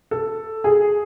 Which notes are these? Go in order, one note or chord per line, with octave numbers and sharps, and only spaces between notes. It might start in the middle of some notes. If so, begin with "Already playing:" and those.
A4
G#4